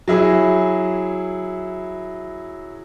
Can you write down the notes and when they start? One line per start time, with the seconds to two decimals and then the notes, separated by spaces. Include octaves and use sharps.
0.08 F#3 E4 G#4